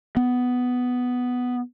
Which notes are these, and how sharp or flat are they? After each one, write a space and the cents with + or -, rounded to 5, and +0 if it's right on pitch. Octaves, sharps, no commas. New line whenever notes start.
B3 +5